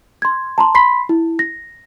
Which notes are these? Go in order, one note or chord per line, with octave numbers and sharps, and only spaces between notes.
C6 G#6
A5 A#5 C6
B5 C6 B6 C7
E4
A#6